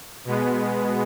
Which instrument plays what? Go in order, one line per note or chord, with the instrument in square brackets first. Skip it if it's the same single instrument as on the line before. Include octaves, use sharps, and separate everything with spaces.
[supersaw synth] B2 G#3 B3